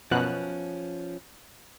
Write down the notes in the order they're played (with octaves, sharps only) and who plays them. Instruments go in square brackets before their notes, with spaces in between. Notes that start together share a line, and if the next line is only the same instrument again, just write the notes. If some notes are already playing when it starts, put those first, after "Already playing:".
[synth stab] F#2 B2 F#6 [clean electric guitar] F3 C#4